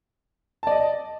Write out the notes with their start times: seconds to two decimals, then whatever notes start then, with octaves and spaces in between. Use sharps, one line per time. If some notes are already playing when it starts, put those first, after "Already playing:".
0.63 A5
0.67 D5
0.71 D#5